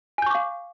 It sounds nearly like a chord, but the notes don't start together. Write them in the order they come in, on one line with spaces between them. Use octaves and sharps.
G#5 G6 C#6 D6 F5